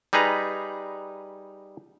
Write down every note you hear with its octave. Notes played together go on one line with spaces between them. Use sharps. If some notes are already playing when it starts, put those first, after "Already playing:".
G3 D#4 G#4 B4 A#5